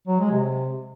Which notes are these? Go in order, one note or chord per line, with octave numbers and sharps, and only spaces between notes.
F#3
G#3
C3